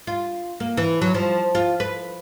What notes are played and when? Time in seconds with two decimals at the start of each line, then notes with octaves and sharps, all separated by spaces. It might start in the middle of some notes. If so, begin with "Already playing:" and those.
0.07 F4
0.60 A#3
0.77 E3
1.02 F#3
1.15 F3
1.55 F4
1.80 B4